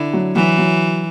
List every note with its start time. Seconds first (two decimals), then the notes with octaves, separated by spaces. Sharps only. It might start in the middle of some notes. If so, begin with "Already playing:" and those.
Already playing: D3 E4
0.13 F#3
0.35 E3 F#3
0.58 F#3